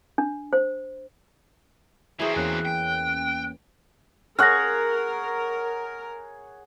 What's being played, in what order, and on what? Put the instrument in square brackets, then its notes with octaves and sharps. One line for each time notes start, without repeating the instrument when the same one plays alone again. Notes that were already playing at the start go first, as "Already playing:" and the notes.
[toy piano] D4
C5
[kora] E3 G#4 [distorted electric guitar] F#3 C4 [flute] E5
[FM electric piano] E2 A#3 C#4 [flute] F#6
[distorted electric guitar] G5
[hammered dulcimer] G#4 C#5 F#5 [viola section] A#4 [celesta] F6 A#6